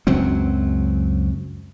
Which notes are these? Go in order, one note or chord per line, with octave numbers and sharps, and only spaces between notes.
C#2 F#2 F#3 C4